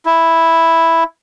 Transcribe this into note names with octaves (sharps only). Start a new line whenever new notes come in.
E4